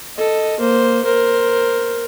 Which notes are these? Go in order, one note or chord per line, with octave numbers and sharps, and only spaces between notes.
A4 D#5
A#3 C5
A#4 C5